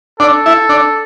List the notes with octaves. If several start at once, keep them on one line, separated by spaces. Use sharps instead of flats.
D4 A4
E4
D4